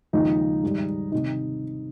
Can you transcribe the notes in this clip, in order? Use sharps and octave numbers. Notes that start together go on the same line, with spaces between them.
D#2 C#3 F3 G#3 D#4
G#2 D#3 G3
C3 D#3 D#4